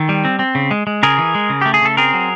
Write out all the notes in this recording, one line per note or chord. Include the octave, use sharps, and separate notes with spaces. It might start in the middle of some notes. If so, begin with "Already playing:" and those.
Already playing: D#3 A4
G3
C4
C4
C#3
G#3
G#3
C#3 G#4 A#4
E3
G#3
C#3
A3 G4
G#4
C#3 A4
C4 G#4 A#4
F#3